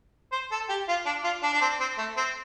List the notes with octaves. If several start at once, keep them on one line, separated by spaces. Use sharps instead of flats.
C5
A4
G4
F4
D4
F4
D4
D4
C4
C4
A3
C4